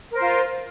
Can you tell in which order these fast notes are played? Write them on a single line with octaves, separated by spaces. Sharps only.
A#4 C5 F4